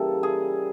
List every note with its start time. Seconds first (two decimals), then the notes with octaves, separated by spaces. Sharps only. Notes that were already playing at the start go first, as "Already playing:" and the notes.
Already playing: C#3 E3 G3 A#3 A4
0.23 G#4